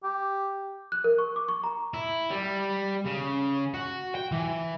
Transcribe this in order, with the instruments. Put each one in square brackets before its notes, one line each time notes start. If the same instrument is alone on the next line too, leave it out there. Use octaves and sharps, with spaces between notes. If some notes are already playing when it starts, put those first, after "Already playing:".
[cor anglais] G4
[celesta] F#6
A#4
C#6
D6
C#6
A#5
[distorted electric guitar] E4
G3
C#3
F#4
G5
E3